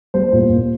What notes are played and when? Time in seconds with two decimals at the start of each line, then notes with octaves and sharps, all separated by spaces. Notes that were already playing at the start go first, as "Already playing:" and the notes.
0.14 G3 C5
0.33 A#2
0.49 A#2